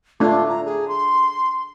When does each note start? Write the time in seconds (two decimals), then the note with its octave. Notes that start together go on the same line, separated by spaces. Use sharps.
0.20 A3 D4 F4
0.49 A#5
0.65 G#4
0.88 C6